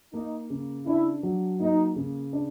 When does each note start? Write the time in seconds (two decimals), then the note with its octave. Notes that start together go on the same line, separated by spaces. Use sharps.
0.13 A#3 D#4
0.50 C#3
0.86 D4 E4
1.23 F#3
1.60 A#3 D#4
1.96 C#3
2.33 D4